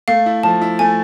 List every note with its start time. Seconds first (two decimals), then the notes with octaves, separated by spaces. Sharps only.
0.08 A3 F5
0.26 E4
0.43 F3 A5
0.61 E4
0.79 A3 G#5